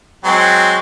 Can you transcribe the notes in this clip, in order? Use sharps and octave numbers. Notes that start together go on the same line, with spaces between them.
F#3 G#3 C4